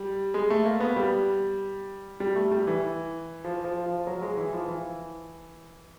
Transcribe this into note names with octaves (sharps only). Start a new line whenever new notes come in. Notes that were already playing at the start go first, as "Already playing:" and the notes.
Already playing: G3
G#3
A3
A#3
B3
G3
G3
A3
G3
E3
F3
F3
F3
F#3
G#3
E3
F3
E3